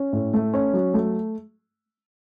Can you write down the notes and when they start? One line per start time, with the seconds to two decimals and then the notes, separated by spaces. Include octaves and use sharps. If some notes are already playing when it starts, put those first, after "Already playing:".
Already playing: C#4
0.13 A2
0.33 A3
0.54 C#4
0.74 F#3
0.94 A3